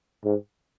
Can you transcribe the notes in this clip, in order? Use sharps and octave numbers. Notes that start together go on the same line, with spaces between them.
G#2